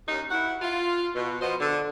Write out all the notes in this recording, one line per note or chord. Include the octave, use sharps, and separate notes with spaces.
D#2 C#4 D#4
E4 F#5
F4
B2
F3 B3 C5 D#5
D3